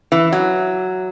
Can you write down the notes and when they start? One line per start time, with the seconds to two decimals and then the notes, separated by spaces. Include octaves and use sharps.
0.12 E3
0.32 F#3